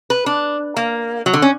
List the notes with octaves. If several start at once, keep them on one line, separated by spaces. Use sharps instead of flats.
B4
D4
A#3
F#3
D3
C#4